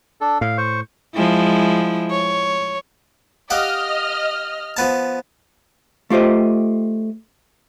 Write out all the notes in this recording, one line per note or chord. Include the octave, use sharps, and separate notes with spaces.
D4 A4
A2 F5
C5 C#6
F3 G#3 E4
C#5
G4 D#5 F5 F#5 F6
F3 B3 A5
A3 F4 G4 C5 D#5